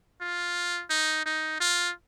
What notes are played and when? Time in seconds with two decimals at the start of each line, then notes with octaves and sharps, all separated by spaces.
0.21 F4
0.90 D#4
1.26 D#4
1.60 F4